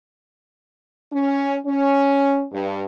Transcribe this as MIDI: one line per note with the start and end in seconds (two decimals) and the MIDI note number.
1.12 1.56 61
1.66 2.44 61
2.51 2.84 43